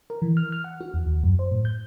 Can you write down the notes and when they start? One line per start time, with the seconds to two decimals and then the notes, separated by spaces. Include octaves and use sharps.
0.10 A#4
0.22 E3
0.37 F6
0.52 F6
0.64 F#5
0.81 F#4
0.94 E2
1.06 D#2
1.24 F#2
1.39 C5
1.51 A2
1.65 G6